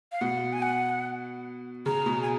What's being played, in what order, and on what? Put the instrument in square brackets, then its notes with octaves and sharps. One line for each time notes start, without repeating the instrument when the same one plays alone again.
[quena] F5
[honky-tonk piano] B2 [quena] F#5
[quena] G#5
F#5
[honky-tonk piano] C#3 [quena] A#5
[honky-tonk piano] B2
[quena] G#5